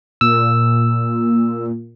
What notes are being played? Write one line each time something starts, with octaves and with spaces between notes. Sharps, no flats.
A#2 E6